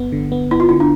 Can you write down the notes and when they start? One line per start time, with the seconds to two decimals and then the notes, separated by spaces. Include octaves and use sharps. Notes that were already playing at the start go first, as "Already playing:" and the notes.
Already playing: G1 B3
0.12 D3
0.32 B3
0.51 B3 E4
0.60 F4
0.69 D3 E4
0.80 D4